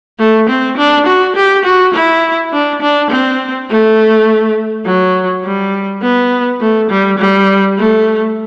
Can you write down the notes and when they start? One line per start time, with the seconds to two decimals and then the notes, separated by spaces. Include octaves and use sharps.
0.19 A3
0.49 C4
0.77 D4
1.06 F#4
1.36 G4
1.65 F#4
1.94 E4
2.53 D4
2.81 D4
3.10 C4
3.69 A3
4.86 F#3
5.44 G3
6.02 B3
6.60 A3
6.90 G3
7.18 G3
7.78 A3